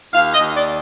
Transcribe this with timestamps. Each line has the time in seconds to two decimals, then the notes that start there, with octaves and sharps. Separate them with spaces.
0.12 D#2 F5
0.33 D#5
0.40 D#2
0.54 D5